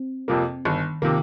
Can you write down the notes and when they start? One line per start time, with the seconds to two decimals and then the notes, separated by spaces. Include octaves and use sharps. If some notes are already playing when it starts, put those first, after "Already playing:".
Already playing: C4
0.28 F2 C3 F3 A#3
0.65 G1 D#3
1.02 C3 D#3 F3 A#3